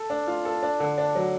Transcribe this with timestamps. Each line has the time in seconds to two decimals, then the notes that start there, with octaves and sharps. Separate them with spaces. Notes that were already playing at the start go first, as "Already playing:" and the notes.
Already playing: A4
0.10 D4
0.28 F4
0.45 A4
0.63 D4
0.80 D3
0.98 D4
1.15 F#3